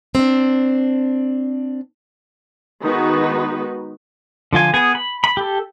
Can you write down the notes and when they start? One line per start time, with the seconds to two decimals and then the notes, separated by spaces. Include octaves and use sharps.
0.15 C4 D4
2.81 D#3 G#3 B3 D#4 F#4 B4
4.53 D3 F3 F4 G#5
4.74 B3 G#4 G#5
4.95 B5
5.24 B5
5.37 G4 A4